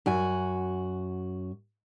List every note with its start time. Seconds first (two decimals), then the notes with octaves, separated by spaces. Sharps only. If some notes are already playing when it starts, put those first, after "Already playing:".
0.06 F#2 F#4 G#5